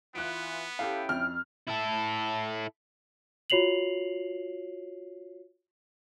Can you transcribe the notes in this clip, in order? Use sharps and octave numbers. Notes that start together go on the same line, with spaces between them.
E3 B3 F4 F#6 D7
C#4 E4 G4 A4 F5 G5
F2 F6
E4 A4
F4 F#4 C#5 C7 F7 F#7